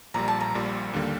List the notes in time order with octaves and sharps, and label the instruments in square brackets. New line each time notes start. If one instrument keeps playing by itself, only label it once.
[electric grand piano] A#1 A#2 G3 [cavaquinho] A#5
[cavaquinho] A5
A#5
[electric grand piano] A#1 A#2 G3
D#2 D3 G3 A#3